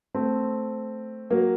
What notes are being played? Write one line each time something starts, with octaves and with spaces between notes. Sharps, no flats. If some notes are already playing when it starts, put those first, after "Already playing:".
A3 C4
F#3 A#3